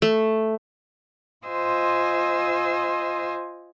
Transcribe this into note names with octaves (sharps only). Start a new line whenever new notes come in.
A3
F4 C5 D#5 G#5 E6